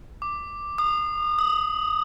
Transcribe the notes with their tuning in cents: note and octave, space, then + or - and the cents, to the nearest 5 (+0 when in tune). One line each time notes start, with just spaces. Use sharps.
D6 +5
D#6 -35
D#6 +15